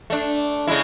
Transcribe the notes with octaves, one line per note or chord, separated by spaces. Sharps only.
A3 D4
C#3 G#3 E4